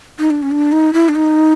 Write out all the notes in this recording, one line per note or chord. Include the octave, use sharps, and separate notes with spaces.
D#4
D4
C#4
D4
D#4
E4
D4
D#4